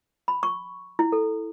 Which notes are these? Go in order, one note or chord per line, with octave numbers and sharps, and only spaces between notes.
B5
C#6
E4
A4